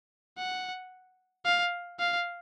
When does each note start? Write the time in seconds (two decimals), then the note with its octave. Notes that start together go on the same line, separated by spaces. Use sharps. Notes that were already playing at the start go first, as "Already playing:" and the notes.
0.38 F#5
1.45 F5
2.00 F5